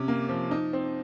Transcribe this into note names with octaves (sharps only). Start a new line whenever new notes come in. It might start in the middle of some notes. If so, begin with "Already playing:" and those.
Already playing: C3 C#4
A#3
F3
D#4
C4